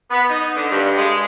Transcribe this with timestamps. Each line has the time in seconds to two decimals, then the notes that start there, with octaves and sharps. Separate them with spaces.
0.11 B3
0.29 D#4
0.56 D3
0.71 G2
0.97 G#3